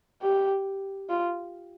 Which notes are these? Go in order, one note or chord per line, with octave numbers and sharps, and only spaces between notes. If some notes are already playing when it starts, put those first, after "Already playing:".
G4
F4